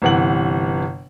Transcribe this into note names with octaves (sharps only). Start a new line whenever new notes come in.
G1 C3 E3 F#5 F#7